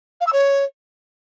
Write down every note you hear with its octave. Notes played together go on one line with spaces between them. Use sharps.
F5
E6
C#5